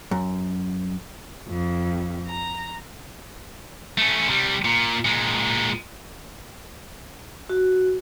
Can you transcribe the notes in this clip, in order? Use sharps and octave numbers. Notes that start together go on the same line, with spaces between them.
F#2
F2
A#5
A3 C#4
C3 G3
A#2
A#2 G#3
F#4